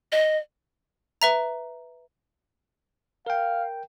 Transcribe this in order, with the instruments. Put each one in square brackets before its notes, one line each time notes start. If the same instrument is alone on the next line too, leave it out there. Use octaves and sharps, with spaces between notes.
[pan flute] D#5
[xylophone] B4 E5 A#5
[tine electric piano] A#4 G5 [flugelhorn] F5